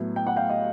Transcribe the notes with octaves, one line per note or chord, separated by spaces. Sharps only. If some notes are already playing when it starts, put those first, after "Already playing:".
Already playing: A2 F#3 B3
G5
F#5
F5 G5
D#5 F5